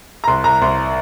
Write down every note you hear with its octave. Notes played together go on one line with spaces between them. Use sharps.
A#5
C2 C6
C2 A#5
C2 C6